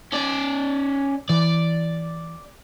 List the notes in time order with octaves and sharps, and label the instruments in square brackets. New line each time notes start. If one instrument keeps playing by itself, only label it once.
[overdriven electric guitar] C#4 D5
[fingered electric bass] E3 [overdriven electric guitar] D5